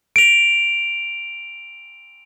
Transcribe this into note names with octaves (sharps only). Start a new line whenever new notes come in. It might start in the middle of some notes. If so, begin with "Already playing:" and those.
D7 F7